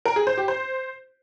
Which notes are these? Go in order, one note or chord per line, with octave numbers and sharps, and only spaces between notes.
A#4
G#4
C5
G4
C5